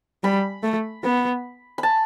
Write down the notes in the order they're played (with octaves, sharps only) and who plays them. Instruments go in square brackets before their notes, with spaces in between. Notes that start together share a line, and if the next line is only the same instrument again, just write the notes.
[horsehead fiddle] G3 [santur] B5
[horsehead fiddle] A3
B3
[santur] B5
A5